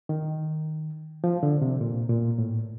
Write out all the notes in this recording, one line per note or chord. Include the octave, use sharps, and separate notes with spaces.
D#3
F3
D3
C3
A#2
A#2
A2